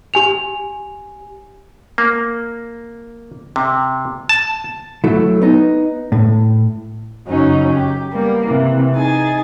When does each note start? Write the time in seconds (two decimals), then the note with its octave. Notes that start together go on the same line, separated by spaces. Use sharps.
0.14 G4 G#5 F7
1.98 A#3
3.56 C3
4.29 A5
5.04 F#3 A3 E4
5.42 B3 D#4
6.12 A2
7.27 F#2 C#3 F#3 C#4 D#4
7.73 G4
8.12 G3 A#3 B3
8.46 C3 E3
8.94 D#4 G#4 G#5 A6